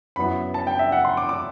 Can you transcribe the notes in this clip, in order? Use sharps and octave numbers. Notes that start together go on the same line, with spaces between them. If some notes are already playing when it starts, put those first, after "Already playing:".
F#2 F#3 B3 E4 B5
A5
G5
E5
F#5
C6
D6
D6